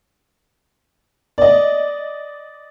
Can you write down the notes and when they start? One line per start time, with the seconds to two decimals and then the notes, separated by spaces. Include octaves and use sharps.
1.38 D5 D#5